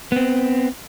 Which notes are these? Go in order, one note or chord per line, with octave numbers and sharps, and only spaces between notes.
B3 C4